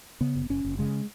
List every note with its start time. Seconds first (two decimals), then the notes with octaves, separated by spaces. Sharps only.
0.21 C#3 B3
0.35 F#1
0.50 F#1 C#4
0.64 F#1
0.79 C#3 G#3